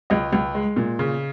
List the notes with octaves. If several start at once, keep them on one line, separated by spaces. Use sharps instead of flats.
C#2 D#5
C#2
G#3
A#2
C#3